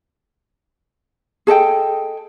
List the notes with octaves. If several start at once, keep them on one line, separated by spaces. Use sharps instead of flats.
G#4 A4 D#5 G5